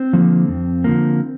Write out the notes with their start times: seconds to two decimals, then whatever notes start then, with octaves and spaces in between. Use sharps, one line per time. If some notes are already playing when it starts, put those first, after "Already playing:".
Already playing: C4
0.13 D3 F3 A#3
0.48 F2
0.84 D3 F3 A#3